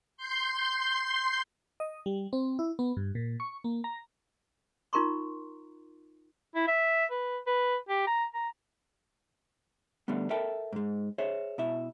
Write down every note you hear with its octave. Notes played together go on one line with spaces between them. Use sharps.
C6 G6
D#5
G3
C4
E4
B3
G2
A#2
C#6
A#3
A#5
D#4 F4 A#4 A#5 C6 C#6
E4
E5
B4
B4
G4
A#5
A#5
D3 G3 A3 B3
A4 A#4 E5 G5 A5
G#2 G#3
G#4 C5 C#5 E5
B2 E4 E5